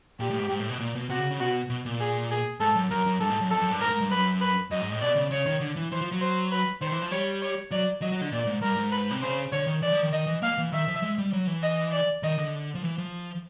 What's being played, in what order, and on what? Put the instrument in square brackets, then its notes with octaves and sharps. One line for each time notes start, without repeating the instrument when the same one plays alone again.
[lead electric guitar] A#2 [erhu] G4
[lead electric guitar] A2
G#2
G#2
A2
B2
A#2
B2
[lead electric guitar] C3 [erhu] F#4
[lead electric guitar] C#3
C#3
[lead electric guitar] B2 [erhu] F#4
[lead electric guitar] B2
A#2
[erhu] G#4
G#4
[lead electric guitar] G#2 [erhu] A4
[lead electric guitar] F#2
[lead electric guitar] F#2 [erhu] A#4
[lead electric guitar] F#2
[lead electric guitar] G2 [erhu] A4
[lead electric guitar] G#2
F#2
[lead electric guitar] F2 [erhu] A4
[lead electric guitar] F#2
G2
[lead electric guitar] G#2 [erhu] A#4
[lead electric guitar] G#2
G2
[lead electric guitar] F#2 [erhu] B4
[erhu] B4
[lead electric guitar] F#2 [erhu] D#5
[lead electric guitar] G#2
A2
[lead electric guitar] B2 [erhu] D5
[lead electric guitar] C#3
[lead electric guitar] C#3 [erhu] C#5
[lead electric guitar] D#3
D3
E3
[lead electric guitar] E3 [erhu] C5
[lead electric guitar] F3
F#3
[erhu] C5
B4
[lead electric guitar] D#3 [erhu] C5
[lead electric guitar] E3
F3
[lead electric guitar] G3 [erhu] C#5
[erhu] C#5
[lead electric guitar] F#3 [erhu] D5
[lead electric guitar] F#3 [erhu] D#5
[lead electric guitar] F#3
D3
[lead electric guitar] A#2 [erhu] D5
[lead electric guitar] G#2
[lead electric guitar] G2 [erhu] A#4
[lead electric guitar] G#2
[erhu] B4
[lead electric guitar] C3
[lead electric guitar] C#3 [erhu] C5
[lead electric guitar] D3 [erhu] C#5
[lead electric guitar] D#3
[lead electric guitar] E3 [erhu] D5
[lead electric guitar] F3
D#3
[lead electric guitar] D#3 [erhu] D#5
[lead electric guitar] E3
[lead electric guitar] A#3 [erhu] F5
[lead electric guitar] E3
[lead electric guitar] D#3 [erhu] E5
[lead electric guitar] F3
G#3
G3
F#3
E3
[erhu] D#5
D5
[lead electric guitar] D#3 [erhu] D#5
[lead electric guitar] D3
F3
E3
F3